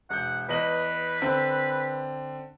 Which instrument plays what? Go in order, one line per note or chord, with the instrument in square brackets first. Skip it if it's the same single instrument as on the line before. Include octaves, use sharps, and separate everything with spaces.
[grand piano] E1 G6 [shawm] F#5
[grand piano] E2 D#5 F#7 [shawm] B4
[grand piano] D3 C4